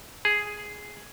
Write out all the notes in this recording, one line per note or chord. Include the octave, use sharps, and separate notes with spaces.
G#4